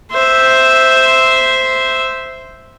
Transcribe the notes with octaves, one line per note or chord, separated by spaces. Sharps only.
C5 E5